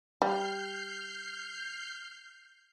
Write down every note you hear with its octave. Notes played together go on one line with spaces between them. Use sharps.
G3 F6 G6 C7